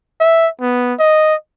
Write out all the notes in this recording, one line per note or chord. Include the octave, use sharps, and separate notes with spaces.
E5
B3
D#5